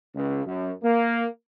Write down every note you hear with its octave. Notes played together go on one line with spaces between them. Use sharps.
C#2
F#2
A#3